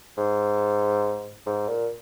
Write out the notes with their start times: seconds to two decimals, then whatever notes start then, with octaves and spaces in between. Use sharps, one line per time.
0.17 G#2
1.46 G#2
1.68 A#2